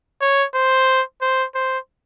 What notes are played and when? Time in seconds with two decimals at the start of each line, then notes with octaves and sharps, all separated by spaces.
0.21 C#5
0.55 C5
1.21 C5
1.55 C5